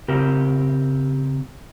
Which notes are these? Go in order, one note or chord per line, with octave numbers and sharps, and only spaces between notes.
C#3 C4 G4 A#4